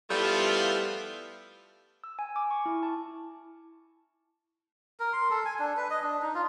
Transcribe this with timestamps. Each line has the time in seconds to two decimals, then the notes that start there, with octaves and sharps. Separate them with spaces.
0.10 F3 G3 A3 B3 E4 F4
2.04 E6
2.19 G#5
2.36 D6
2.51 C#6
2.66 E4
2.83 A5
5.00 A#4
5.13 C6
5.30 A4
5.45 G#5
5.59 D4
5.77 B4
5.90 D#5
6.03 D4
6.22 D#4
6.35 F4